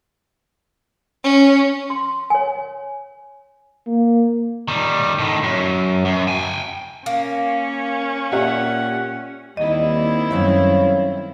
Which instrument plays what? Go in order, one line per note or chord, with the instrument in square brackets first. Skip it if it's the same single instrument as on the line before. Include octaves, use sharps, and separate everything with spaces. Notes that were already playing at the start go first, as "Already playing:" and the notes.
[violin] C#4
[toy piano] C6
C#5 G#5
[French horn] A#3
[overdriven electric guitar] D#3 G3
A2 D#3
F#2
F#2
G5 G#5
[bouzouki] A#3 [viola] C#4
[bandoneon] A#2 F#5 [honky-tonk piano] G4 E5
[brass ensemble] D#2 G3 [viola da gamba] D#3 C4 E4 [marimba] D#5
[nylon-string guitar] F#2 A3 E5 [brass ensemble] G3 C#5 F5